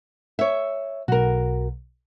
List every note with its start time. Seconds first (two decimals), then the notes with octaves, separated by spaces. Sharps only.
0.39 C#5 E5
1.08 B1 F#4 A#4